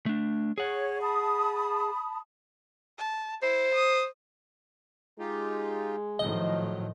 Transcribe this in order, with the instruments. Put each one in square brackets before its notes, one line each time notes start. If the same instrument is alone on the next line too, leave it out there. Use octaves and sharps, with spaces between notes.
[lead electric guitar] A3 D4
[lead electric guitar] G#4 F#5 [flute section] C#5
[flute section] A5 B5 D#6
[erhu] A5
[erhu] E4 [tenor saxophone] C5
[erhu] D#6
[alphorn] G#3 [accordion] D#4 F4 G4
[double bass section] A2 D#3 F3 [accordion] F#3 [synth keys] D#5